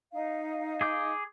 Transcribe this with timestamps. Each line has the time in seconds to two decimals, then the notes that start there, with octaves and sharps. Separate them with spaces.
0.12 D#4 F5
0.81 G#4 D6 G6